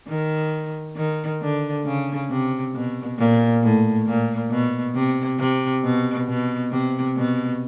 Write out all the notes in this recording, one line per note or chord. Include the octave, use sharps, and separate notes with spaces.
D#3
D#3
D3
C#3
C3
B2
A#2
A2
A#2
B2
C3
C3
B2
B2
C3
B2